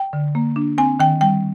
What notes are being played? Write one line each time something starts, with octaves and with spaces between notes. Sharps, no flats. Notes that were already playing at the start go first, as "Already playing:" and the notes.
Already playing: G5
D3
A#3
D4
C4 G#5
D#3 G5
G3 G5